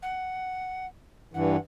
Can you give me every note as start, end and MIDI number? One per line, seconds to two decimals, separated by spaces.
0.02 0.85 78
1.34 1.56 43
1.34 1.56 52
1.34 1.59 78